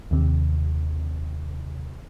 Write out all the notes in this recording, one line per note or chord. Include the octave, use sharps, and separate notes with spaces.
D#2 C3